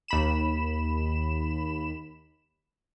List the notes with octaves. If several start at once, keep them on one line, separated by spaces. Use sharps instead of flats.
D#2 B5 E7